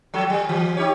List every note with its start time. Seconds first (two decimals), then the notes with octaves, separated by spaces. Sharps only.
0.14 F3 F#3 A4
0.30 G3
0.49 E3
0.77 D#4 G4 C#5